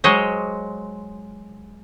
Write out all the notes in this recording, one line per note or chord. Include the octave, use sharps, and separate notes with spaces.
F#3 G#3 C5 C#5 D#5